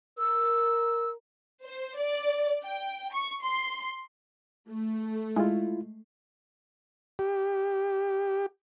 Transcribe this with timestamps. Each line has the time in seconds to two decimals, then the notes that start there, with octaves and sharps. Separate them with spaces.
0.18 A#4 E6
1.64 C5
1.98 D5
2.63 G5
3.13 C#6
3.42 C6
4.69 A3
5.36 G#3 E4 F4
7.19 G4